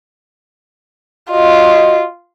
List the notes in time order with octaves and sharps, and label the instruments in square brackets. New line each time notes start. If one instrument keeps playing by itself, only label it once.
[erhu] F4 [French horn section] F#4 D#5